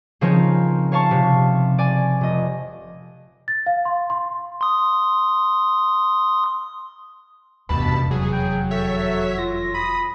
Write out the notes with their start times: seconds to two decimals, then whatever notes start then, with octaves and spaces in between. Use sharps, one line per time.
0.21 C#3 F3 C4 D#4 A#4 C#5
0.92 C#5 F5 A5 C#6
1.11 C3
1.78 D5 G#5
2.21 F1 D#5
3.48 A6
3.66 F5
3.85 C6
4.10 C6
4.61 C6 D#6
7.69 F1 E2 G2 B2 A5 B5
8.11 F#3 G#4
8.32 G5
8.71 A4 C#5 E5 B6
9.38 F4 A#6
9.74 B5 D#6